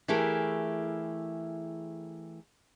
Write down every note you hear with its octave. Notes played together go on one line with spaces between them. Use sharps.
E3 A3 E4 G4 G#4 A#4